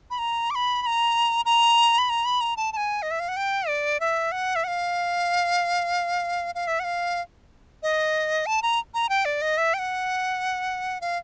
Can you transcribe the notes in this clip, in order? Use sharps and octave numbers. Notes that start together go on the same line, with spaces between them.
B5
A#5
D6
B5
B5
A#5
A#5
B5
A#5
B5
A#5
A5
A5
G#5
D#5
E5
F5
F#5
G5
D5
E5
F#5
E5
F#5
F5
F5
E5
F#5
F5
D#5
A5
A#5
A#5
G5
D5
D#5
E5
G5
F#5
F5